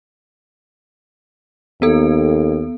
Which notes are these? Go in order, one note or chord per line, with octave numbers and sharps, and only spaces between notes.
D#2 B3 A4